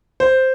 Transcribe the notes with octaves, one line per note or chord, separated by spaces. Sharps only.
C5